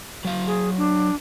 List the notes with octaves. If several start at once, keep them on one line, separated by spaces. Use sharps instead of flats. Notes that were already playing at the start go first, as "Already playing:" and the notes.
F#3 F5
G#4
D4